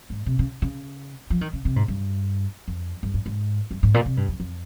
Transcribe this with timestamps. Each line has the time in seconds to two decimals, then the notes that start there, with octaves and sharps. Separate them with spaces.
0.10 G#2
0.26 C3
0.39 C#3
0.62 C#3
1.30 F3
1.41 D#3
1.53 C#3
1.65 C3
1.76 G#2
1.88 G2
2.68 F2
3.03 G2
3.14 G2
3.26 G#2
3.71 G2
3.83 G#2
3.94 A#2
4.06 C3
4.17 G2
4.28 F2
4.40 F2